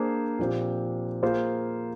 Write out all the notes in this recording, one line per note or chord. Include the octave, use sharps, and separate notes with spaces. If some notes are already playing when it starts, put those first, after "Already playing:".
Already playing: A#3 D4 G#4 C5
A#2 F3 C4 G4
A#3 F4 G#4 C5